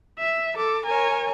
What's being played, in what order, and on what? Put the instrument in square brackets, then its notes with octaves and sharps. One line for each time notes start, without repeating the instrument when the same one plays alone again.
[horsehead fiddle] E5
[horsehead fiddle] A4 [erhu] D6
[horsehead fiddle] A#4 C#5 [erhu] G#5